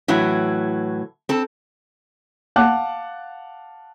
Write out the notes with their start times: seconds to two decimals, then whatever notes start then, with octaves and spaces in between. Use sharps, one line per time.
0.08 A2 E3 F#3
1.29 C4 A4
2.56 F5 F#5 A5 D6 F#6